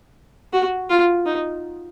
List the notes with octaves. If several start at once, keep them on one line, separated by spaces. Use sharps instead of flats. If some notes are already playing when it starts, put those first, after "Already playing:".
F#4
F4
D#4